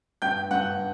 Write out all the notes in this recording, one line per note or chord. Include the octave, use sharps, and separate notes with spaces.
G2 G5 G6
G2 F#5 F#6